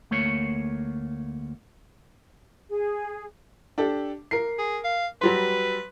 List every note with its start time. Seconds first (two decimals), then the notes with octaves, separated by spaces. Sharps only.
0.11 D2 A3 A#3 C#5
2.70 G#4
3.78 D4 G4 A4
4.31 A#4 C7
4.59 G#4
4.84 F5
5.21 F#3 G3 B4 C6